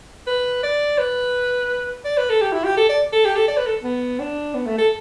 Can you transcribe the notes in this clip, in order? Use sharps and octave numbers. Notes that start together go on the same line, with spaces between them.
B4
D5
B4
D5
B4
A4
G4
E4
G4
A4
D5
A4
G4
A4
D5
B4
A4
B3
D4
B3
A3
A4